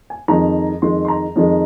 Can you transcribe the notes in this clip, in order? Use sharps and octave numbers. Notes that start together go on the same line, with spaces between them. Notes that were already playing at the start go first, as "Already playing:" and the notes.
G#5
F2 D#3 G#3 A#5
F2 D#3 G#3 C6
C6
A#5
F2 D#3 G#3